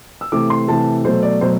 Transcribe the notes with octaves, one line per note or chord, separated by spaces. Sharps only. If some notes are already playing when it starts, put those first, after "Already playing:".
E6
C3 E3 A3 D6
C6
C3 E3 A3 A5
B2 F#3 A3 C5
D5
B2 F#3 A3 C5